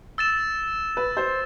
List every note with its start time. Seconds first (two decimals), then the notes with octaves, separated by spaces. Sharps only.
0.18 E6 A6 E7
0.97 B4
1.17 C5